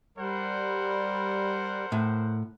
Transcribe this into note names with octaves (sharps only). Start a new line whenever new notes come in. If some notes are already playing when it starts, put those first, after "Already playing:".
G3 A#4 C5 F#5
A2